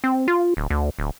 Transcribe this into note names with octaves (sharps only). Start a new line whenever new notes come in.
C4
F4
D1
D2
D1